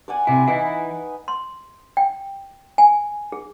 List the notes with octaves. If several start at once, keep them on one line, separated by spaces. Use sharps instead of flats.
D5 F#5 G#5
C3 E4 D6
E3 D#4 E4 B4
C6
G5
G#5
G#4